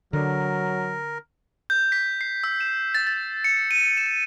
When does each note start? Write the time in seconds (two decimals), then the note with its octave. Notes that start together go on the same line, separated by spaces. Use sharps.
0.13 D3 F#3 A#4
1.70 G6
1.92 B6
2.21 C7
2.44 E6
2.60 E7
2.95 A6
3.07 A6
3.44 C#7
3.71 D#7
3.97 E7